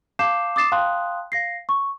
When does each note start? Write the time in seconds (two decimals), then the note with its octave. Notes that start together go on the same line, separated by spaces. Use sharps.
0.19 F5 A5 D6 G6 C7 E7
0.56 D6 D#6 A6 C7 E7
0.72 F5 G5 A5 C6 D#6 F#6
1.32 F5 A#6 C7
1.69 C#6